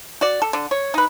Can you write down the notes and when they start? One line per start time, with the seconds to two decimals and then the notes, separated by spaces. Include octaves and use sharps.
0.21 F#4 D5
0.42 A4
0.53 D3
0.71 C#5
0.94 D#4 B4